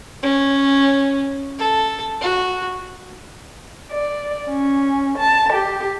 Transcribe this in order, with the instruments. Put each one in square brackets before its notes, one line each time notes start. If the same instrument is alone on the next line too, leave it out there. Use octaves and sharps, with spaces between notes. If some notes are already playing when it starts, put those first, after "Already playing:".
[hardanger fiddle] C#4
A4
F#4
[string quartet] D5
C#4
A5
G4